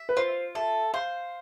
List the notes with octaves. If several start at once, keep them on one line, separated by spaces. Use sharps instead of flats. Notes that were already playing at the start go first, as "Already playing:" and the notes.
Already playing: E5
B4
F4 C5
A4 E5
C5 F5